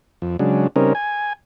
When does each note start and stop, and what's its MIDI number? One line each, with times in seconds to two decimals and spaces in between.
0.22 0.37 41
0.39 0.67 49
0.39 0.67 54
0.39 0.67 56
0.39 0.67 62
0.76 0.93 49
0.76 0.93 55
0.76 0.93 60
0.76 0.93 61
0.76 0.93 63
0.76 0.93 70
0.95 1.33 80